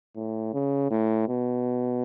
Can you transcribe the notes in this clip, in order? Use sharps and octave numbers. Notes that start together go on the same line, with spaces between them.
A2
C#3
A2
B2